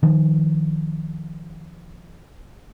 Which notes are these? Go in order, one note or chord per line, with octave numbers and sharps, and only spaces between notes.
D#3 F3